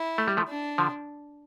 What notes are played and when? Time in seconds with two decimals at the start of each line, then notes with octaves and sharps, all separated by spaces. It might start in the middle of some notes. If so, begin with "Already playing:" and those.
Already playing: E4
0.18 A3
0.28 G3
0.37 F3 A3
0.48 D4
0.78 D3 F3